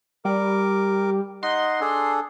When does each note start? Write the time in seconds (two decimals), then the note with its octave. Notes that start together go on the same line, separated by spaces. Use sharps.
0.25 G3 A#4 D6
1.43 D#4 D#5 F#5 C6
1.80 D4 G#4 A4